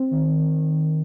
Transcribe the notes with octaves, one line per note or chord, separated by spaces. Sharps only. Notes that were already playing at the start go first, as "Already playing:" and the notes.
Already playing: C4
D#3